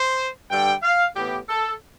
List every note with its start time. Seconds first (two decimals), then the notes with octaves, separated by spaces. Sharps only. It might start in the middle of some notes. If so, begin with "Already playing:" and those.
Already playing: C5
0.49 G2 D3 G3 G5
0.82 F5
1.15 A2 E3 B3 G4
1.49 A4